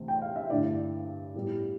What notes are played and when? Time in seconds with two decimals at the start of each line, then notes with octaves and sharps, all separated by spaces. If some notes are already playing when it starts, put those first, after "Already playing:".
Already playing: C2 C3 E3 A3 C4
0.08 G5
0.22 F5
0.36 E5
0.50 G2 D3 A3 E4 D5
1.34 A2 G3 B3